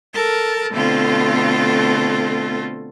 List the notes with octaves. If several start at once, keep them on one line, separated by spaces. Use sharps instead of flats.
A4 A#4 A5
B2 D3 A3 C4 F4 A4